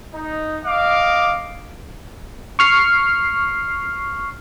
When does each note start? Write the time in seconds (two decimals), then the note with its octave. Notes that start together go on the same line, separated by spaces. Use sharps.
0.14 D#4
0.65 D#5 F5 D6
2.59 C#6 F6 C7